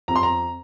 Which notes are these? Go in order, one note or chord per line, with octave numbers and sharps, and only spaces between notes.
F2 A#5
C6
A#5